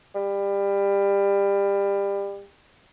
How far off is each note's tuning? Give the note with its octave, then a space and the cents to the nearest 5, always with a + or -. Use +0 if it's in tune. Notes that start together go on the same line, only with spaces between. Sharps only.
G3 +25